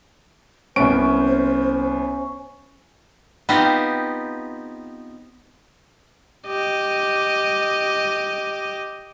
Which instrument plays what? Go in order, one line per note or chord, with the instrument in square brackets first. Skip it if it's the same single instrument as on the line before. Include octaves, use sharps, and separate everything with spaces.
[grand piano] C2 B3 D7 [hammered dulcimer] C#4 [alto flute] C5
[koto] B3 C4 D#4 F4 G4
[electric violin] G4 D#5